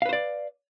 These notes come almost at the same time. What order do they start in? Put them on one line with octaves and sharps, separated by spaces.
F5 B4 C5 D5